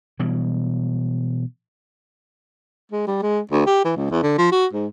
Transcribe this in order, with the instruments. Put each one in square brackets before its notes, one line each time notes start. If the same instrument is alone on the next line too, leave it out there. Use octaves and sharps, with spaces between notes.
[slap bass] B2 E3 G3
[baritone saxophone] G#3
G3
G#3
D2
G4
E3
C#2
E2
D3
F3
F#4
G#2